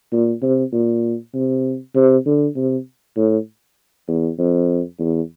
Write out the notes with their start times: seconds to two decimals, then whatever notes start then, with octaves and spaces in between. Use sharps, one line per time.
0.12 A#2
0.42 C3
0.73 A#2
1.34 C3
1.95 C3
2.26 D3
2.56 C3
3.17 A2
4.08 E2
4.39 F2
4.99 E2